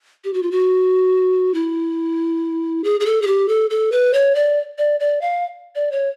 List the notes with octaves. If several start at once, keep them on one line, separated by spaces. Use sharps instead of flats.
G4
F#4
F4
F#4
E4
G#4
G#4
A4
G#4
G4
A4
A4
B4
C#5
D5
D5
D5
F5
D5
C#5